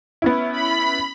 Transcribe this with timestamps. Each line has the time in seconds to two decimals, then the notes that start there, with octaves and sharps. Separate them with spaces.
0.22 B3 C#4 E4
0.52 B5